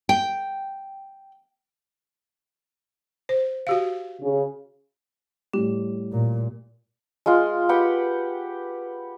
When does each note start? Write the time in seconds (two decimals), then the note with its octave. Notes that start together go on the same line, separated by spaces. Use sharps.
0.09 G5
3.29 C5
3.67 F#4 G4 F5
4.21 C#3
5.53 A2 G3 G4
6.12 A#2
7.26 G#3 F4
7.69 G4 B4 F#5 G5